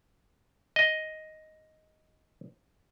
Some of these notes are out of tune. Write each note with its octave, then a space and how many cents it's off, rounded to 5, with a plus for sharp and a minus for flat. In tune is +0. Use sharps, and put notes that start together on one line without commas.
D#5 +5